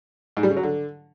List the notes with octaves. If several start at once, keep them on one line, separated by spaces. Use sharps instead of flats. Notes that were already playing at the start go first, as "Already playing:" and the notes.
G#2
G3
C#3
F#3
D3